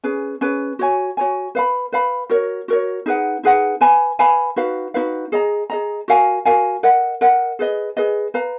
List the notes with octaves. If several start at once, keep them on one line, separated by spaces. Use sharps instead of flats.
C#4 G#4 B4
C#4 G#4 B4
F#4 C#5 G#5
F#4 C#5 G#5
B4 F5 B5
B4 F5 B5
F#4 A#4 C#5
F#4 A#4 C#5
D#4 G#4 B4 F#5
D#4 G#4 B4 F#5
B4 F5 G#5 B5
B4 F5 G#5 B5
D#4 F#4 B4 F5
D#4 F#4 B4 F5
G#4 D#5 A#5
G#4 D#5 A#5
F#4 A#4 F5 G#5
F#4 A#4 F5 G#5
A#4 D#5 F#5
A#4 D#5 F#5
G#4 B4 D#5
G#4 B4 D#5
B4 F5 A#5